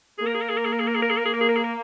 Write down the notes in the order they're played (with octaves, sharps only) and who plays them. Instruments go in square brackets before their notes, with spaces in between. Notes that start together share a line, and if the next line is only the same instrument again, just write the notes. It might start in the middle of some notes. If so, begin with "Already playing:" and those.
[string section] A#3 [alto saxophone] G#4
[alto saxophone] A#4
G#4
A#4
G#4
A#4
G#4
A#4
G#4
A#4
G#4
A#4
G#4
A#4
G#4
A#4
G#4
A#4
G#4
A#4